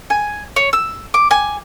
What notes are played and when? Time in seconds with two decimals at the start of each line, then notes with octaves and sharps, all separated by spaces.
0.10 G#5
0.56 C#5
0.73 E6
1.14 D6
1.31 G#5